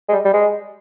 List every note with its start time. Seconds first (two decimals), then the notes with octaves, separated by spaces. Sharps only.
0.09 G#3
0.12 G3
0.25 G3
0.34 G#3